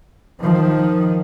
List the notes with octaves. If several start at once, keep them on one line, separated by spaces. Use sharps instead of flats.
D#3 F3